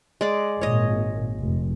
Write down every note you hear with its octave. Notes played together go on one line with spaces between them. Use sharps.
G#3 D5
G#1 A#2 C#5 D#5
F1